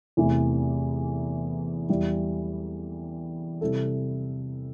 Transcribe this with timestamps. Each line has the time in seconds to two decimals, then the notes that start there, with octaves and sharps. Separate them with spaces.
0.17 E2 C3 E3 A3 E4
1.89 E2 E3 G3 E4
3.61 C3 G3 E4 A4